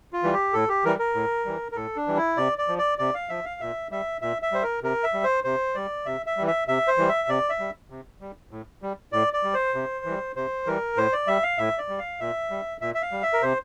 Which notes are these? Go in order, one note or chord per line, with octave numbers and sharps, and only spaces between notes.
F4
E3 G3
G4
A2 A4
G4
E3 G3 A#4
A#4
A2
E3 G3
A#4
A2 A4
D4
E3 G3
E4
C3 D5
D5
F3
D5
C3 D5
F5
F3 E5
F5
A#2 E5
G3 E5
A#2 E5
E5
G3 C5
A#4
C3 A#4
E5
G3
C5
C3 C5
G3 D5
C3 E5
E5
E3 G3
E5
C3 E5
C5
E3 G3
E5
C3 D5
E5
G3
C3
G3
A2
G3
A2 D5
D5
G3
C5
C3
E3 G3
C3 C5
E3 G3 A#4
A2 C5
D5
G3 E5
F5
A2 E5
D5
G3
F5
A#2 E5
G3
A#2 E5
E5
F5
G3
E5
A#4
C3 C5